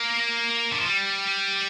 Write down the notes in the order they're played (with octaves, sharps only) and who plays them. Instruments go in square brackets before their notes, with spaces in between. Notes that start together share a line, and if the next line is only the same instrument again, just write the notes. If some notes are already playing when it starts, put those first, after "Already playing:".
Already playing: [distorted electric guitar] A#3
D3
F3
G3